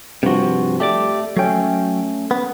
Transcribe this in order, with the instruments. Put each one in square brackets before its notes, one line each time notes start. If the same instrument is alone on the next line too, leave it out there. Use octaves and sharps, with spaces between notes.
[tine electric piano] G2 F#4 [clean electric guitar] C3 F3
[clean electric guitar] A3 [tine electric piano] G4 D5 D6
[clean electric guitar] F#3 G5 [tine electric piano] A3 C#4
[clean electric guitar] B3